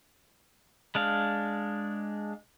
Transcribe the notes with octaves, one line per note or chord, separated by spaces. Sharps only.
G#3 D4 F5